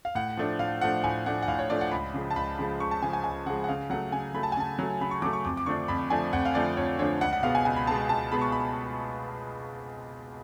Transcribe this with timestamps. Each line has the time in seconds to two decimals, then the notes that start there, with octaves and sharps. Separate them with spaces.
0.05 F5
0.15 A2 F#5
0.37 F3 A3 D4
0.59 A2 F5
0.81 F3 A3 D4 F#5
1.04 A2 G#5
1.26 F3 A3 D4 F#5
1.42 F#5
1.48 A2 F5
1.59 C#5
1.70 F3 A3 D4 D5
1.81 F#5
1.91 C#2 B5
2.14 C#3 F3 G#3
2.30 A5
2.36 C#2 B5
2.58 C#3 F3 G#3 B5
2.80 C#2 C#6
2.91 A5
3.02 C#3 F3 G#3 G#5
3.13 G#5
3.24 C#2 G#5
3.46 C#3 F3 G#3 F#5
3.64 F#5
3.69 C#3 F5
3.90 F#3 A3 F#5
4.12 C#3 G#5
4.34 F#3 A3 B5
4.43 A5
4.52 G#5
4.57 C#3 A5
4.79 F#3 A3
5.01 C#3 B5
5.11 C#6
5.22 F#3 D6
5.26 A3
5.33 C#6
5.45 F2 D6
5.57 D6
5.66 D3 F3 A3 D4 C#6
5.88 F2 B5
6.10 D3 F3 A3 D4 G#5
6.33 F2 F#5
6.45 F5
6.55 D3 F3 A3 D4 D5
6.77 F2 C#5
6.99 D3 F3 A3 D4 C#5
7.21 C#2 F#5
7.33 F#5
7.43 B2 G#3 B3 F5
7.55 G#5
7.65 C#2 G#5
7.76 B5
7.87 B2 G#3 B3 A5
8.09 C#2 A5
8.32 B2 G#3 B3 B5
8.41 C#6
8.52 B5